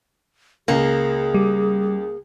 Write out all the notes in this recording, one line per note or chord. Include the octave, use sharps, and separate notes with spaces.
C#2 A#3 G#4
G3